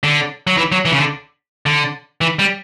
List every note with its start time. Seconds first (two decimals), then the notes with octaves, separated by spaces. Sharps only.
0.03 D3
0.47 F#3
0.57 E3
0.72 F#3
0.85 E3
0.92 C#3
0.98 D3
1.66 D3
2.21 E3
2.39 G3